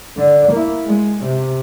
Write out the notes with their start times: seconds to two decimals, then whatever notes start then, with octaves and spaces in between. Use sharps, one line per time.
0.17 D3
0.52 A#3 E4
0.86 G#3
1.24 C3